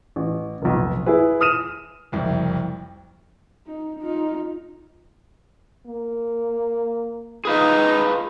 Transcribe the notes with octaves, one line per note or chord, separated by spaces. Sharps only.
A1
F1 B1
E4 G#4 B4
D#6 F6 D#7 E7
F#1 C2 F2
D#4
D#4 F4
A#3
D#4 F4 G#4 B4 F5